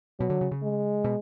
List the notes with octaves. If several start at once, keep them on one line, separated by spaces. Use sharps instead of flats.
B2 F#3
D3
C#3
C#3
G#3
B2